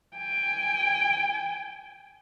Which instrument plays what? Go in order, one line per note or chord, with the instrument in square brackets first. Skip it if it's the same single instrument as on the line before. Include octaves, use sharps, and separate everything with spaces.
[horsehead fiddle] G5 G#5